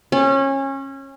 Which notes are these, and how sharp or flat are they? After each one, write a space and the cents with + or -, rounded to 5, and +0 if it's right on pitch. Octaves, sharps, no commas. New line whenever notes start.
C#4 -25